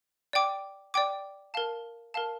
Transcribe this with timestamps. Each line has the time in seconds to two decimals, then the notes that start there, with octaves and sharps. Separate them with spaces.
0.33 D5 G5 D6
0.94 D5 G5 D6
1.54 A#4 F5 A5
2.14 A#4 F5 A5